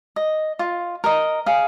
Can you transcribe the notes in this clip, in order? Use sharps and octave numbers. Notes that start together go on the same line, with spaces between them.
D#5
F4
A#4 D#5
G#4 F5